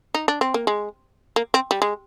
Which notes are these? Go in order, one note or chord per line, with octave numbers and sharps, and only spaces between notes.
D#4
D4
C4
A#3
G#3
A#3
C4
G3
G#3